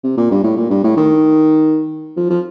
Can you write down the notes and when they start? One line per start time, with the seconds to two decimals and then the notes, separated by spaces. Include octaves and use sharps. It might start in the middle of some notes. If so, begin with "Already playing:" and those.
0.04 C3
0.17 A#2
0.31 G2
0.44 A2
0.57 A#2
0.70 G2
0.84 A2
0.97 D#3
2.17 F3
2.30 F3